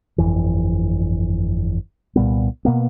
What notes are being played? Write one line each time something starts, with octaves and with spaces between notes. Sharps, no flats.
G1 F2 E3
C2 A#2 G3 B3
B2 A#3 B3